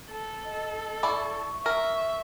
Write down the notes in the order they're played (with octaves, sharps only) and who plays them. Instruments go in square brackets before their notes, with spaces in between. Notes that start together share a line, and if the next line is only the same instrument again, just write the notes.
[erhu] A4
[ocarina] D#5
[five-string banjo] E4 D5 [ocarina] C#6
[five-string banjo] A#4 [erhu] E5